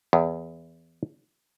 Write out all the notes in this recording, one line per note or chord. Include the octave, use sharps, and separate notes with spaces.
E2